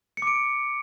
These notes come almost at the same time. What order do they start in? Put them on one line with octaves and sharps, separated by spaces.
C#7 D6 D7